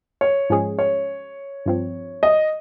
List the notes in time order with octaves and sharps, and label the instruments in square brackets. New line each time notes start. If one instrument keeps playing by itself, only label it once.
[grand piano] C#5
[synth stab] G#2 F3 G#3 C#4 G#4
[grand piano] C#5
[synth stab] G2 F3 C4
[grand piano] D#5